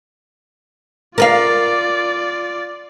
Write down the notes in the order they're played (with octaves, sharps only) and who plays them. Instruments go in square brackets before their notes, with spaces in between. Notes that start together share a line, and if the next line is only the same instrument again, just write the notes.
[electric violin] F4 D5 [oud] A#4 B4 F5